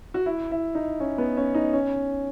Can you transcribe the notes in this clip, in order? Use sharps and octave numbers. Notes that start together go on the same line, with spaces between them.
F#4
E4
E4
D#4
C#4
B3
C#4
D#4
C#4